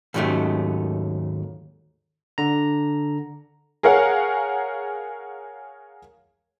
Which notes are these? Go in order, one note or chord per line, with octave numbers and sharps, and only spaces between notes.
D#2 G#2 D#3 F#3 A3 C#4
D3 A#5
G#4 A#4 C#5 F5 F#5